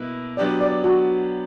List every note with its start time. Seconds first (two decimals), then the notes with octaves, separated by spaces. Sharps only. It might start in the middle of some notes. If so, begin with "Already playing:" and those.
Already playing: B2 A#3 E4 B4
0.37 F#3 B3 D4 G4 D5
0.61 D5
0.84 F#4